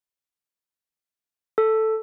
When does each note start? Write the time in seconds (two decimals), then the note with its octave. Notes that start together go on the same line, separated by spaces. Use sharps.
1.58 A4